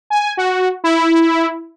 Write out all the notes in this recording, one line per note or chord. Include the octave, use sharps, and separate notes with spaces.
G#5
F#4
E4